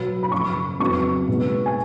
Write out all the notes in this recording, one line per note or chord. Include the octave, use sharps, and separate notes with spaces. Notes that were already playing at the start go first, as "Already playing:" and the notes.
Already playing: B2 F#3 B3 B5
B5
F#2 C#3 F3 C#6
F2 C#3 F#3 B3 C#6
B2 G#3 B3 D#4
G#5